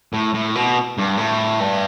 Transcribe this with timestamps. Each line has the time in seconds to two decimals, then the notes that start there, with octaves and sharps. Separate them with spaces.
0.13 A2
0.34 A2
0.55 B2
0.98 G2
1.18 A2
1.60 G2